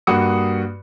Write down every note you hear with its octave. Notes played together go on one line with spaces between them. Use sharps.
G2 A#3 F#4 D#6 C#7